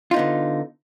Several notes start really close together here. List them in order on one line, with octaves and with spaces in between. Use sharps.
F4 D#4 B3 D3